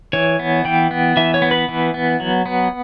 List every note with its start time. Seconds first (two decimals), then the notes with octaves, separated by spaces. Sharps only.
0.13 E3 C#5
0.39 B3
0.65 E3 G5
0.91 B3
1.17 E3 E5
1.34 C#5
1.42 B3
1.51 B4
1.69 E3
1.94 B3
2.20 F#3
2.46 B3